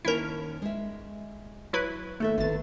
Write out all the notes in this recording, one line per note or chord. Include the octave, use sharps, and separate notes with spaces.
D#2 C#4 E4 A#4 A5
G#3 E5
F#3 E4 B4
D#2 A3 A4 E5
G#1 E2 D3 A6